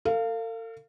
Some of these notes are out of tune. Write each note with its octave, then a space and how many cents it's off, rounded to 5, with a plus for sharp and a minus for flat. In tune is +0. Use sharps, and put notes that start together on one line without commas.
A4 +45 F5 -10